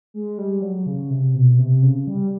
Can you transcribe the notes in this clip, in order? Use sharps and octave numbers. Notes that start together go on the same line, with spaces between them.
G#3
G3
F#3
C#3
C3
B2
C3
C#3
G3